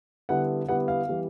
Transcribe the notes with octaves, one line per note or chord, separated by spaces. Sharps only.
D3 G3 B3 E4 F#5
D3 G3 B3 E4 F#5
F5
E3 G3 B3